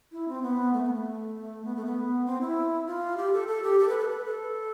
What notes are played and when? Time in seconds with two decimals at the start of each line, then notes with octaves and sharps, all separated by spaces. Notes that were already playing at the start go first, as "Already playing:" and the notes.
0.12 E4
0.28 C4
0.43 B3
0.73 A3
0.83 B3
0.94 A3
1.65 B3
1.76 A3
1.85 B3
2.26 C4
2.41 E4
2.87 F4
3.17 G4
3.33 A4
3.48 A4
3.63 G4
3.79 A4
3.89 B4
3.98 A4
4.09 B4
4.25 A4